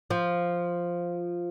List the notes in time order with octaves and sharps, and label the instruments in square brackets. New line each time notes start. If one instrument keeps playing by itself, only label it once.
[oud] F3